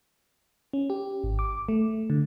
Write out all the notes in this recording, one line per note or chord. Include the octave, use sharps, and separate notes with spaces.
C#4
G4
G#1
D6
A3
D3